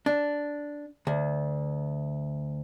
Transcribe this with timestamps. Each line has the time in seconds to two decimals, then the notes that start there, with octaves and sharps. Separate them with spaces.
0.06 D4
1.07 D2